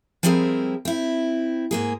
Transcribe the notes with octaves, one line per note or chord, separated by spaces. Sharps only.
F3 G3 C4 E4 G#4 A#4
C4 E4
G#2 A#3 G#4